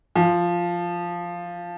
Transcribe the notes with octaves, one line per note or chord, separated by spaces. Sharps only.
F3